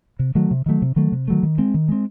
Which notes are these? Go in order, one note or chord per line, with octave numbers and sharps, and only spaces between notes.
C3
D#3 F#3 A3
C3
D#3 F#3 A3
C3
D#3 F#3 A3
C3
D#3 F#3 A3
D#3
G#3 C4
D#3
G#3 C4